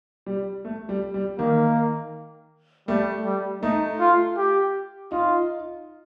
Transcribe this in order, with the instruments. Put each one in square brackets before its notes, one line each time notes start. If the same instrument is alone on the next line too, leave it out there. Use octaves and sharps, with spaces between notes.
[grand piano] G3
A3
G3
G3
[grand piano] D#3 [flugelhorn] A#3
[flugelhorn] G3 [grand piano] A3
[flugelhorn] G3
[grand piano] A3 [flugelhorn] D#4
[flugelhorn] F4
G4
[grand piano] D#4 [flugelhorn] F4